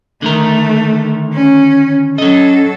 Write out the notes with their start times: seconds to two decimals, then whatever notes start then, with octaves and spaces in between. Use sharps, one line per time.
0.22 D3 D#3 A3 A#4
1.33 C#4
2.18 F#3 C#4 A4 D#5